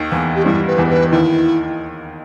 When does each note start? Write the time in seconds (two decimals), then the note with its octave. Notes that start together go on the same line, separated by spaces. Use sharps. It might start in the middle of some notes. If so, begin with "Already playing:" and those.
Already playing: D#2 D#3
0.12 E2 E3
0.36 G4
0.45 G2 G3 E4
0.67 B4
0.78 E2 E3
0.90 B4
1.11 D#2 D#3 E4